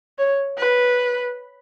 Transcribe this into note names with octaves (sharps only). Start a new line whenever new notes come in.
C#5
B4